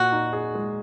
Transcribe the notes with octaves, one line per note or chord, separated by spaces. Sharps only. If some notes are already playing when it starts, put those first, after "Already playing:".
Already playing: A#2 F#4
D#4
G#4
G#3